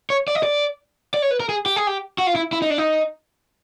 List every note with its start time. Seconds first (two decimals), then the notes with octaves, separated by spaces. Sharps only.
0.10 C#5
0.28 D5
0.35 D#5
0.43 D5
1.14 D5
1.22 C#5
1.31 B4
1.40 A#4
1.49 G#4
1.66 G4
1.76 G#4
1.87 G4
2.18 F#4
2.27 F4
2.35 E4
2.53 E4
2.62 D#4
2.70 D4
2.78 D#4